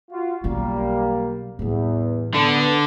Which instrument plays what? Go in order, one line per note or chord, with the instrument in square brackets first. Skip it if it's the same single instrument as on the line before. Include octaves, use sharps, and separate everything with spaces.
[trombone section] F4 F#4
[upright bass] B1 C#4 [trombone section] G3 A#3
[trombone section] E2 [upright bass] A2 G3
[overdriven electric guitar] D3 [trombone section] B3 A4